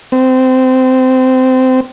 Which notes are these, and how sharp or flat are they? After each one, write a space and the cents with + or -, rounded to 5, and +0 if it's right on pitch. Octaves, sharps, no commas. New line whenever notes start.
C4 -20